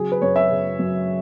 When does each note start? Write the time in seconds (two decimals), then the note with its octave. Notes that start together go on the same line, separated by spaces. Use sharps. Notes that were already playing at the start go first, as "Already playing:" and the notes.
Already playing: C#3 F#3 G#4
0.12 B4
0.22 F#2 C#5
0.36 E5
0.50 C#3
0.79 F#2